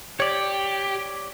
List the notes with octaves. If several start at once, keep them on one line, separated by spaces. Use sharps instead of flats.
G4 C#5 D5